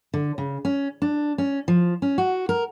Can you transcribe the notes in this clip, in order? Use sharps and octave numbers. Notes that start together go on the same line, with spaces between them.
D3
C#3
C#4
D4
C#4
F3
C#4
F#4
A#4